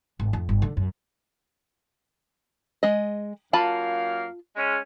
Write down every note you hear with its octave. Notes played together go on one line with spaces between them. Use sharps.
G#1
F2
G1
D3
F#2
G#3 D#5
F#2 A#3 F4 F5 A5 B5
G#3 C#4